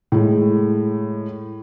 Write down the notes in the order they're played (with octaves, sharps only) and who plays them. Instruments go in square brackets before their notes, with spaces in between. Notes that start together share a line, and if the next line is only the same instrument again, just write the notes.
[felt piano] A2 G#3